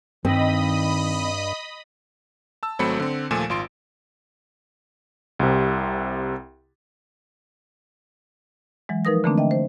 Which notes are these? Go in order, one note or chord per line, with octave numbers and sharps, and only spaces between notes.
G2 D#3 C4 D#5 B5 D#6
A5 E6
G#1 F#3 A3 C4 B5 C#7
D3 C4
D#2 A#2 F3 A3 G#5 E7
G#1 F4 C6 D7
C2 C3
E3 F#3 G#3
F3 D#4 A#4 B4 D#6 A#6
D3 E3 A3 A#3 C4 D4
D#5 E5 G5
C5